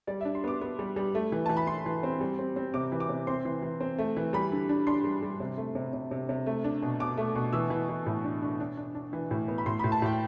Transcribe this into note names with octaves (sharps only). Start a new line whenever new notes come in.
G3 D5
E5
D4
C6
B3 D6
B3
G3
G3
A3
E3
E3 A5
B5
E3 C6
E3
C4
G3
C4
C4
C3 D6
E3
D6
C3
C4 C6
E3
E3
C4
A3
E3
G3 B5
D3
D4
D4 C6
G3
G3
C3
A3
C3
C3
C3
C3
A3
D4
B2
B2 D6
A3
B2
E3 E6
E3
E3
A2
D4
D4
D4
D4
D4
E3
A2
B3
B5
A2 C6
B5
A2
A5
A2 G5